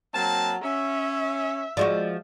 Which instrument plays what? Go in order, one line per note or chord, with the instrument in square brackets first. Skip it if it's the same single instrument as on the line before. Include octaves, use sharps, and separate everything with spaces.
[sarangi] F#3 [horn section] A#3 C4 A5
[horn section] C#4 [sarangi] E5
[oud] F3 G#3 F#4 [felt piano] D5